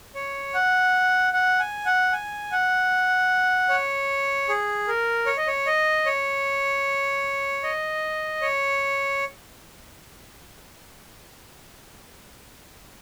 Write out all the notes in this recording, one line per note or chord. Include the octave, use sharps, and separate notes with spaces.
C#5
F#5
F#5
G#5
F#5
G#5
F#5
C#5
G#4
A#4
C#5
D#5
C#5
D#5
C#5
D#5
C#5